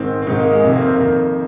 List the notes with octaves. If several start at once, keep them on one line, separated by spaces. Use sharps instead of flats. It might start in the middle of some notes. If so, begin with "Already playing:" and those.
Already playing: G#2 D#3 C4
C4
G#2 D#3 D#4
A#3
G#3
F2 C3 D#3
A#3
C4
A#3
F2 D#3